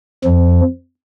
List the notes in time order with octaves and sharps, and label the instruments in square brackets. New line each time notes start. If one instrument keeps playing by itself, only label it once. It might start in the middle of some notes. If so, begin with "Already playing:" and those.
[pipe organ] F2 F3